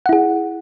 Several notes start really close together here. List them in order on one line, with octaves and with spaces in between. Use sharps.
F#5 E4 G#4